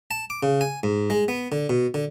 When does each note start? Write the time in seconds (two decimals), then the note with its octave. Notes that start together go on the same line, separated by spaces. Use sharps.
0.11 A5
0.30 D6
0.43 C#3
0.61 G#5
0.83 G#2
1.10 G#3
1.28 B3
1.52 D3
1.69 B2
1.94 D3